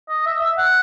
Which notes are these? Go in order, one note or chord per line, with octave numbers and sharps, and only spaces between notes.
D#5
E5
E5
F#5